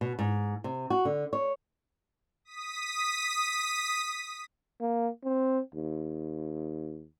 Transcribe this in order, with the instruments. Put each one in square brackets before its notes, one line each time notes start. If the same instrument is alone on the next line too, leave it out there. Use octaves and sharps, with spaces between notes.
[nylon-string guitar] B2
G#2
C3
F#4
D3
C#5
[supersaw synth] D#6 B6
[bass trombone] A#3
C4
D#2